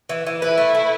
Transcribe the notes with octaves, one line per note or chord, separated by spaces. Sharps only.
E3
E3
E4 B4
A3
A3